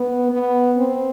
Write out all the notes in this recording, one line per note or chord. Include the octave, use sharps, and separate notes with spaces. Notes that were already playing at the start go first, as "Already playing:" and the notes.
Already playing: B3
B3
C4